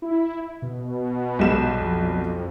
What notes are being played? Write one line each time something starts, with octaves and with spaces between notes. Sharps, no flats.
E4
B2
B1 G3 E7
F2